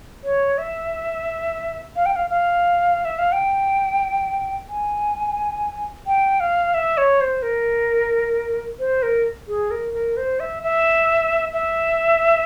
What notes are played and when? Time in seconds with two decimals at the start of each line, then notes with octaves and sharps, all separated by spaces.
0.24 C#5
0.58 E5
1.96 F5
2.06 G5
2.16 F5
2.30 F5
3.05 E5
3.19 F5
3.32 G5
4.69 G#5
6.07 G5
6.40 F5
6.74 E5
6.97 C#5
7.21 C5
7.42 A#4
8.79 C5
9.03 A#4
9.48 G#4
9.71 A#4
9.94 A#4
10.17 C5
10.40 E5
10.63 E5
11.53 E5